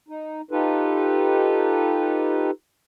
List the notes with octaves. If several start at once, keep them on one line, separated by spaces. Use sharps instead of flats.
D#4
D#4 F4 G4 A4 B4